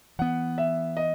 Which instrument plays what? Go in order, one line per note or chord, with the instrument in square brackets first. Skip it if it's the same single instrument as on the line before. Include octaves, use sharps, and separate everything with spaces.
[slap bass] E3 B3 [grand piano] F#5
[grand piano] E5
D#5